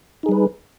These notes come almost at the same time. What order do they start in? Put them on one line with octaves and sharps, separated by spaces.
D#4 G#4 G3 B4